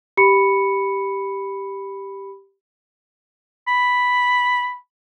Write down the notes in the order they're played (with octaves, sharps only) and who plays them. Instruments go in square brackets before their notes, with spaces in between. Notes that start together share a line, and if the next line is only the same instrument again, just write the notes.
[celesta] G4 B5 C#7
[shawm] B5